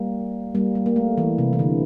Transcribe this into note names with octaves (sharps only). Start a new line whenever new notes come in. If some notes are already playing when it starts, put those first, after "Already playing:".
Already playing: G3 A#3
G3 A#3
G3
A#3
A3
E3
C3
E3
D3